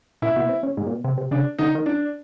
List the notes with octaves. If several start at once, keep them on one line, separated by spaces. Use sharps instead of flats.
A#2 E4
B2
C3
C#3
G#2
A#2
B2
C3
C3
C#3 D4
D3 D#4
D#3
E3 D4